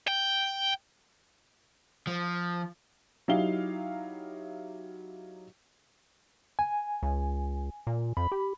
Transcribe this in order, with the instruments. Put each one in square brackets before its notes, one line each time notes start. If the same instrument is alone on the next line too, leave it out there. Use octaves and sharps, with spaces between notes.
[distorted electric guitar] G5
[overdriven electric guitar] F3
[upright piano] F#3 D#4 E4 G4 F5 G7
[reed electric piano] G#5
[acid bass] C#2
A#2
[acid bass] F2 [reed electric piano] B5
[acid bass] G4